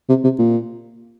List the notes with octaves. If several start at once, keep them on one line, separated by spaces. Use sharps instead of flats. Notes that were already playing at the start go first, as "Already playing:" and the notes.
C3
C3
A#2